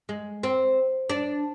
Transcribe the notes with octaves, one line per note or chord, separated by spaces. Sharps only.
G#3
C4
D4